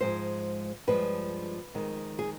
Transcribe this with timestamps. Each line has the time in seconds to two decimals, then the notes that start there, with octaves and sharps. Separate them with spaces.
0.01 G#2 F3 G#3 C5
0.87 G2 F3 G#3 B4
1.74 F2 D#3 G#3
2.19 G#4